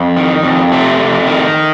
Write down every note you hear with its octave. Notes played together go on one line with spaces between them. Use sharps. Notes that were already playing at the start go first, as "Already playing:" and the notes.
Already playing: F2
D#3
F2
C3 A3
F2
D#3